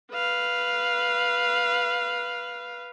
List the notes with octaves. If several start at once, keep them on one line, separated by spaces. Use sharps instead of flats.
B4 F5